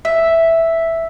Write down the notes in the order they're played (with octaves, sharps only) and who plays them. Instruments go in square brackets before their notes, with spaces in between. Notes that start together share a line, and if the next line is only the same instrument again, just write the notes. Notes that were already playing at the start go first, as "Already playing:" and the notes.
[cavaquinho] E5